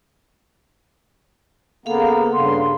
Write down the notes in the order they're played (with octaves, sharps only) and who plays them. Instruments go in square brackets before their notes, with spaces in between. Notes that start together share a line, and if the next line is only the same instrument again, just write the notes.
[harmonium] C#3 A#3 B3 [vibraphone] A4 F5
[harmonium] G2 C#3 [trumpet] C6